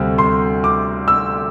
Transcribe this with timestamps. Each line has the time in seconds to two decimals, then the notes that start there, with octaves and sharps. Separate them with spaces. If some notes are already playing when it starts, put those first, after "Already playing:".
Already playing: D2 C3 G3 C4
0.18 C6
0.64 D6
1.08 E6